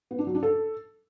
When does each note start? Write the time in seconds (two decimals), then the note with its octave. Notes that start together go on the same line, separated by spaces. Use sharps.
0.11 B3
0.19 D4
0.27 F#3
0.35 D4
0.43 A4